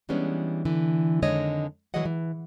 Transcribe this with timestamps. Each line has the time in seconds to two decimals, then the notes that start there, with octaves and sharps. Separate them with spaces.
0.09 E3 G3 G#3 B3 C#4 D4
0.65 D3 E3
1.22 F2 D3 D#3 G#3 C#5 D#5
1.94 E3 F#3 G#3 G#4 D#5 F#5
2.05 E3